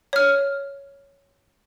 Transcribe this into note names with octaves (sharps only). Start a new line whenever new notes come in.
C#5 F6